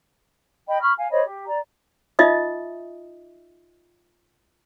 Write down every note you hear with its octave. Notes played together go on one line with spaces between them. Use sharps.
D#5 G5 B5
B5 C#6 F6
F5 G#5
C5 C#5 D#5 B5
G4
D5 A#5
D#4 F4 D#5 E5 D#6